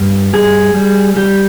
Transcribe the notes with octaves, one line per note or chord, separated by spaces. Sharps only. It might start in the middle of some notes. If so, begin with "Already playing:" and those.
Already playing: G2
G3 G#4
G3
G3 G4